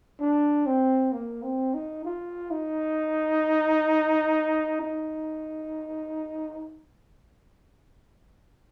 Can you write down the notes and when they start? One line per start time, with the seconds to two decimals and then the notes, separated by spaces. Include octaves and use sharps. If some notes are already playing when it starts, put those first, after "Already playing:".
0.21 D4
0.66 C4
1.12 A#3
1.43 C4
1.74 D#4
2.05 F4
2.51 D#4
4.82 D#4